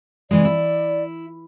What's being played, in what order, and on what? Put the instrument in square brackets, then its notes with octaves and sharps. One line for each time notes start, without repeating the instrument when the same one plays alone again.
[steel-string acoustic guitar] C3 E3 G#3 [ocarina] D5
[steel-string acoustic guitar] E4